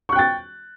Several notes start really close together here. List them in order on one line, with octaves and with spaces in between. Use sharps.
C#6 F#6 G5 A6